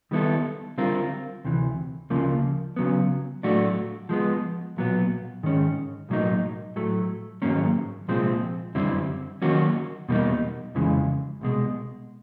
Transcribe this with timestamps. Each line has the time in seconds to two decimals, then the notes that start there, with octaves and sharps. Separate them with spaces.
0.11 D#3 G3 B3 E4 A4
0.78 D3 G3 C4 F4 A#4
1.44 D2 C3 E3
2.10 D2 C#3 F3 A#3
2.76 C#3 F#3 B3
3.43 A2 F#3 A3 D4 F#4
4.09 F3 G#3 B3
4.77 B1 A#2 F#3 B3
5.43 G#2 D#3 G#3 C#4
6.09 B1 A2 F#3 A#3 D#4
6.76 A2 F#3 A3
7.42 G#2 D#3 F#3 A#3 C#4
8.08 C2 A#2 F3 G#3 C4
8.75 F#2 D3 G3 C4 E4
9.42 D#3 F#3 A#3 C#4 F#4
10.08 E2 B2 G3 A#3 D#4
10.75 F2 C#3 E3 G#3
11.41 C2 B2 G#3